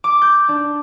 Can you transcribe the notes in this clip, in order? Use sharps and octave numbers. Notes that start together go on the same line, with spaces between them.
D6
G6
D4